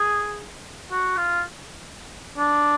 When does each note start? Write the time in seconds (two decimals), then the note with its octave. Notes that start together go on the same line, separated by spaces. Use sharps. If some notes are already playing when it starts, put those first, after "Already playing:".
Already playing: G#4
0.91 F#4
1.17 F4
2.37 D4